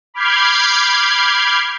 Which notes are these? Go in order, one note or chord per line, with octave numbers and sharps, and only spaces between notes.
B5 D6 F6 G6 G#6 C7